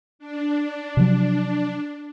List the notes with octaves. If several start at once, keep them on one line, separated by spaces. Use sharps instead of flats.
D4
C3 F3 F#3